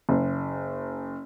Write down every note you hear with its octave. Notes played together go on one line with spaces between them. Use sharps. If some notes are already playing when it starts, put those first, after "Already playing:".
F#1